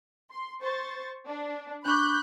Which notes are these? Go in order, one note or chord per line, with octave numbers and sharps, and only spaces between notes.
C6
C5 C#6 A6
D4
D4 B5 C#6 D6 F#6 G6